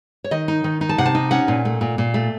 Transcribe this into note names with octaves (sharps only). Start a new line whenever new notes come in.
C#5
D#3 D#5
D#4
D#3
D#4
A5
C3 F#5
A5
D#4
C#4 F#5
A#2
A3
A#2
A#2
A3